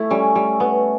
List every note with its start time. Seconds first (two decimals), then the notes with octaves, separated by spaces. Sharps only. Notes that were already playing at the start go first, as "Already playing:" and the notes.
Already playing: A3 E4
0.10 G3 C#4
0.35 G3
0.60 B3